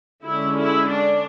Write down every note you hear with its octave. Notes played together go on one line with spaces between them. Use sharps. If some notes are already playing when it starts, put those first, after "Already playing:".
D3 G#3 C#4 E4
E4
D4